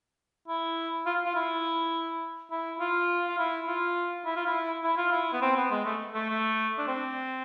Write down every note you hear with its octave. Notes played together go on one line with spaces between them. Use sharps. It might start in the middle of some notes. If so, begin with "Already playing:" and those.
E4
F4
F4
E4
E4
F4
F4
E4
F4
E4
F4
E4
E4
F4
E4
B3
C4
B3
G#3
A3
A3
A3
D4
C4